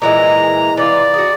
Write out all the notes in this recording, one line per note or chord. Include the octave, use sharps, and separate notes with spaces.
A#2 E3 G#3 A#5
E3 F4 D5
F#4 G#4